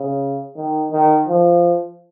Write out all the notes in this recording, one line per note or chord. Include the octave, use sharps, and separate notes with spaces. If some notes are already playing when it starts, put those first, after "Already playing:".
Already playing: C#3
D#3
D#3
F3